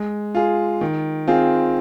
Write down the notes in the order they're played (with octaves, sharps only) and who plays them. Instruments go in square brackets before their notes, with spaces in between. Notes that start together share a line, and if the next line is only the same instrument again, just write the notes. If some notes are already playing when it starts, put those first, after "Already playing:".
Already playing: [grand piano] G#3
F4 G#4
D#3
C4 F4 G#4